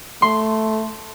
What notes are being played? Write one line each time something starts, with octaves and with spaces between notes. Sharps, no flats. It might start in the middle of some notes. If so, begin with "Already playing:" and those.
A3 C6